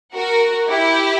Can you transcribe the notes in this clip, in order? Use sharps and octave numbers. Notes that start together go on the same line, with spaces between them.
F#4 A#4
E4 G4